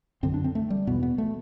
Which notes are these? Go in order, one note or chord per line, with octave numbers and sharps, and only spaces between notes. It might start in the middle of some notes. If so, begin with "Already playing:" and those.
F#2 D3 C4
D4
C4
A3
G3
E2 B2 B3
B3
A3